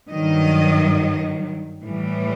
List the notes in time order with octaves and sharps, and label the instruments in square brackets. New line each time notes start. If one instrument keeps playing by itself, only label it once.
[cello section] G2 D#3 F#3 D#5
A2 E3 G3